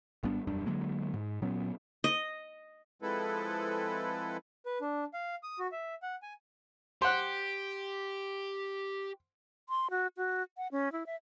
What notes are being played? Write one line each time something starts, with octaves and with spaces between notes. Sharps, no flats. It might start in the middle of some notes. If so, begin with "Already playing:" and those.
G#1 G3 B3 D4
E1 F#2 G3 D4
D3 F#3 G#3 A#3
G#2
A#2 F#3 B3 C#4
D#5
F3 G#3 C4 E4 A4 B4
B4
D4
F5
D#6
F#4
E5
F#5
G#5
G4 C5 F#5
C6
F#4
F#4
F#5
C#4
E4
E5